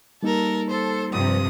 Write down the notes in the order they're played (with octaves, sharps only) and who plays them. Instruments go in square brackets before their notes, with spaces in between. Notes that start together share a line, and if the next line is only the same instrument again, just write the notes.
[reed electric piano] G3 A#3 D#4 [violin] A4 A#4
[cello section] A4 [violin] C5
[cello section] G2 C3 F3 [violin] D#6